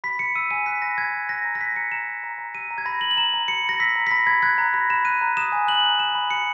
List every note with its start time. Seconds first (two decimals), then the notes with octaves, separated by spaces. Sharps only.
0.04 B5 B6
0.19 B5 C#7
0.35 E6 D#7
0.50 G#5 D#7
0.66 F#6 B6
0.82 B5 A#6
0.98 F#6 G#6
1.14 B5
1.29 F#6 A#6
1.45 A#5
1.55 A#6
1.61 F#6 B6
1.76 A#5 C#7
1.92 A#5 E7
2.07 A#5
2.24 A#5
2.39 A#5
2.55 E6 D#7
2.71 A#5
2.78 G#6
2.86 B5 A#6
3.01 B5 F#7
3.11 F#7
3.17 A#5 E7
3.33 A#5
3.48 B5 C#7
3.64 B5 A#6
3.80 E6 B6
3.96 A#5
4.07 B6
4.11 B5 A#6
4.27 B5 G#6
4.42 F#6 G#6
4.58 A#5
4.74 B5 A#6
4.90 B5 E7
5.05 F#6 D#7
5.22 A#5
5.37 D#6 E7
5.52 G#5
5.67 F#6 F#7
5.83 A#5
5.99 F#6 E7
6.15 B5
6.30 F#6 C#7